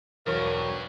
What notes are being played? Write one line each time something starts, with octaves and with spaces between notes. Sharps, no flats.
E1 B1 G2 A#4 C#5 C#6